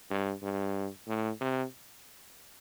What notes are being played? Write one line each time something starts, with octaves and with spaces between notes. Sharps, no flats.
G2
G2
A2
C3